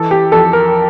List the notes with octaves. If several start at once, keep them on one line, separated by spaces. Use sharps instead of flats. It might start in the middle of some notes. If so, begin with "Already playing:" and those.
Already playing: E3 A4
G4
F2 A4
A#4